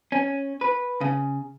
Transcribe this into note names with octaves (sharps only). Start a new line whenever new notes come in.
C#4
B4
C#3